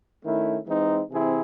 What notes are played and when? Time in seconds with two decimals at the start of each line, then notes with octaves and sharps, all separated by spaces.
0.24 D#3 A3 C#4 E4
0.66 E3 G#3 C4 D#4
1.10 C3 E3 C4 E4 G#4